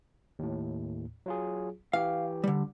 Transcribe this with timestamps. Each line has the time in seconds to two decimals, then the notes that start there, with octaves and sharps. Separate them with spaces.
0.39 D#2 A2
1.26 F#3 F4 G#4
1.93 E3 G4 F5
2.44 D3 G3